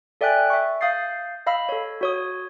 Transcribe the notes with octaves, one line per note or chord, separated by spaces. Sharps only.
A4 D5 E5 G5 G#5 F#6
E5 C#6
F5 D#6 G6 A6 C7
D#5 F5 B5 E6
A4 C#5
F#4 C#5 D#6